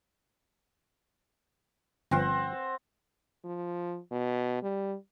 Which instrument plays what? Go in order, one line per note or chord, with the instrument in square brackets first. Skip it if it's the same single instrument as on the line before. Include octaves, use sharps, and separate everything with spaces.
[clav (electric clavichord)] G1 F3 F5 [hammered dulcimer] C4 F#5
[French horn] F3
B2
G3